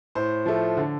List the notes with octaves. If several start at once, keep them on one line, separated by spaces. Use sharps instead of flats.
A2 C5
F3 A3
D3